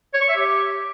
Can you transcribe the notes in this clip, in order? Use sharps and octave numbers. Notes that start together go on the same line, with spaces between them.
C#5
C#6
E5
G4